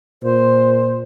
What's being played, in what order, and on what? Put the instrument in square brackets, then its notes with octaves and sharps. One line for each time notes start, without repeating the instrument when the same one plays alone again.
[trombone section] A#2 [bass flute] C5